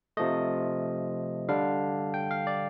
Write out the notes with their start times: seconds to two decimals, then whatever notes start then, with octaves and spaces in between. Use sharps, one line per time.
0.17 C3 F3 A3 D#5
1.48 D3 G3 D4 F5
2.14 G5
2.31 F5
2.47 D5